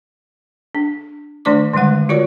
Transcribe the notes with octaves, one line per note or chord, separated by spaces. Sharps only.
D4
D#3 A3 D4 D5 C#6 D6
D3 D#3 G3 G#3 F#5
F4 F#4 A#4 C#5 D5 C#6